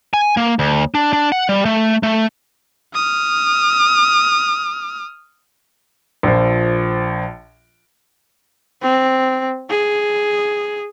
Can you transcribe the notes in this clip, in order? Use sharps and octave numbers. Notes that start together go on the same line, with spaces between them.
G#5
A#3
D2
D4
D4
F#5
G3
A3
A3
D#6 F6
A#1 F3
C4
G#4